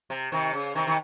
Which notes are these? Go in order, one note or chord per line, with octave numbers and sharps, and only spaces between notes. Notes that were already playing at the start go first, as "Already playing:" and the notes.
C3
C3 D#3
C#3
C3 D#3
D#3